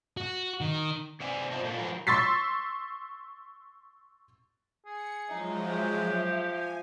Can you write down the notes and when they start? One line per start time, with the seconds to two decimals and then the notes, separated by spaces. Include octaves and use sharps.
0.17 F#4
0.61 D#3
1.20 C3 D5 E5 G#5
1.51 F4 C5 D5 D#5 A5
1.64 A#2 A3 A#3
1.78 E3 F3 F#4 A#4
2.07 C6 C#6 E6 A6 B6 C7
4.86 G#4 C#7
5.29 F3 F#3 G#3 D#4 E5
5.67 G4
6.09 F3
6.44 G#5